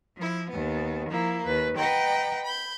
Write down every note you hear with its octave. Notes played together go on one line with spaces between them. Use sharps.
F3 E4
D#2 B3
F3 A#3 E4
D#2 B4
B4 D#5 F#5 G5 A#5
B5 G6